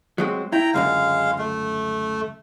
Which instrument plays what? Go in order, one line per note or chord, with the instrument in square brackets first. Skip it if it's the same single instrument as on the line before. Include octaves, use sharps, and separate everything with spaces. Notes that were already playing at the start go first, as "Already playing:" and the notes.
[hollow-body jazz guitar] F#3 G#3 C4
[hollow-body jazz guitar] E4 [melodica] G5 A#5
[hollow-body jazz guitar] C#2 F#2 D3 [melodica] G#3 F5
[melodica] A3